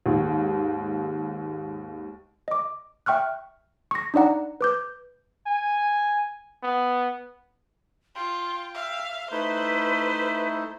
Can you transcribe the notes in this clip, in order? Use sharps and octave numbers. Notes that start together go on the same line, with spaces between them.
D#2 G#2
D#5 D6
E5 G5 C#6 F6 F#6
C#6 A#6
D4 D#4 D5 F#5 A#5
B4 D6 G6
G#5
B3
F4 G5 C6
E5 F5
A3 D#4 E4 B4 C5